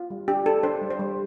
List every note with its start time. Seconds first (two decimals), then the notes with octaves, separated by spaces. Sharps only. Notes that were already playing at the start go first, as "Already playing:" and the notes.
Already playing: F4
0.10 G3
0.28 D4 G4
0.46 D4 A4
0.63 D4 C5
0.81 G3
0.91 C5
0.99 G3